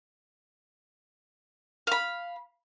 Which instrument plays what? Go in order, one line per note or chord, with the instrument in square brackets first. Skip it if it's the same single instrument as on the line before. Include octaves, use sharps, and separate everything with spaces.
[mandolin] F5 B5